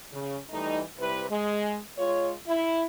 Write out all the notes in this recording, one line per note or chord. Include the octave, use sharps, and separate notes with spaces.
C#3
E3 G3 A3 D#4
C3 G3 E4 B4
G#3
G#3 F4 C#5
E4